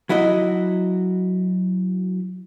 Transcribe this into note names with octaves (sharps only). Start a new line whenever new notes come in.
F#3 E4 F#4 D#5